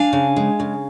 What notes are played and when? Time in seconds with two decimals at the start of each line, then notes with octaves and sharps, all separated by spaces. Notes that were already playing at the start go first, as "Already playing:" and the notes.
Already playing: D4 F5 G#5
0.13 C#3
0.36 G#3
0.60 C#3